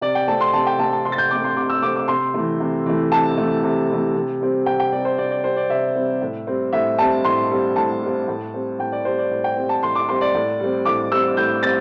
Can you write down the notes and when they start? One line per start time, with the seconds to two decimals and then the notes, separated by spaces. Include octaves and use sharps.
0.01 C3 D5
0.15 G5
0.28 A3 C4 A5
0.41 C6
0.53 C3 A5
0.67 G5
0.79 A3 C4 A5
0.93 A5
1.05 C3 C6
1.12 A6
1.18 G6
1.31 A3 C4 D6
1.44 C6
1.57 C3 D6
1.70 E6
1.82 A3 C4 D6
1.96 D6
2.08 C3 C6
2.34 E3 A3
2.60 C3
2.86 E3 A3
3.12 C3 A5
3.38 E3 A3
3.63 C3
3.89 E3 A3
4.15 C3
4.41 G3 C4
4.66 C3 G5
4.80 G5
4.92 G3 C4 D5
5.05 C5
5.18 C3 D5
5.31 D5
5.44 G3 C4 C5
5.57 D5
5.70 C3 E5
5.95 G3 C4
6.21 A2
6.47 G3 C4
6.73 A2 E5
6.98 G3 C4 A5
7.24 A2 C6
7.50 G3 C4
7.76 A2 A5
8.02 G3 C4
8.28 A2
8.54 G3 C4
8.79 A2 G5
8.92 D5
9.05 G3 C5
9.09 C4
9.18 D5
9.31 A2
9.44 G5
9.57 G3 C4
9.69 A5
9.83 A2 C6
9.95 D6
10.08 G3 C4 C6
10.21 D5
10.34 A2
10.60 G3 C4
10.85 A2 D6
11.11 G3 C4 E6
11.37 A2 G6
11.63 G3 C4 A6